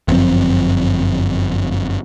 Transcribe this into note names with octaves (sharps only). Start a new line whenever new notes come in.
G1 F#2 F3 C4